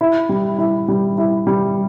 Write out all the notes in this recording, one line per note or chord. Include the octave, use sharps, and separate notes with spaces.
E4
G3
E4
G3
E4
G3